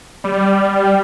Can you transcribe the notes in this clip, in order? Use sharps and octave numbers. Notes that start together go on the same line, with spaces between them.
G3